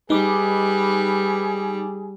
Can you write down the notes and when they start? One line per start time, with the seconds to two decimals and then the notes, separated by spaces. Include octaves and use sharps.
0.10 G3 D#4 G#4 B4 D6